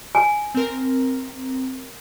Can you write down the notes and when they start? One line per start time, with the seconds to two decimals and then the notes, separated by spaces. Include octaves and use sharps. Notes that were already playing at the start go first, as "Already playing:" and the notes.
0.15 G#5
0.55 C4 A#4